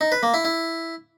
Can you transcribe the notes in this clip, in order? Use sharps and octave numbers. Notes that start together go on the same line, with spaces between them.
D#4
B4
A#3
E4
E4